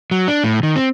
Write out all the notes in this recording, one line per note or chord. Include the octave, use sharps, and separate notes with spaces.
F#3
D4
A2
D#3
C4